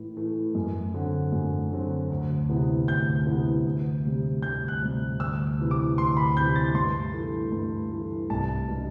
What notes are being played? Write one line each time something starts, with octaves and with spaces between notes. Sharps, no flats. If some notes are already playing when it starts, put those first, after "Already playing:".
Already playing: A2 E3 A3
E3 A3 E4
F#2
D3 F#3 C4
F#2
D3 F#3 C4
D2
C3 E3 B3 E4
D2 G6
C3 E3 B3 E4
D2
C3 G3
D2 G6
F#6
C3 G3
D2 E6
C3 E3
D6
D2 C6
B5
C3 E3 G6
A6
G2 C6
E3 A3
G2
E3 A3
C2 A5
B2 G3 D4